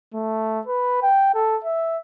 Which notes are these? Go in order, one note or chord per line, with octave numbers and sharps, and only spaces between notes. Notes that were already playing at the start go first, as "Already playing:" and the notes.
A3
B4
G5
A4
E5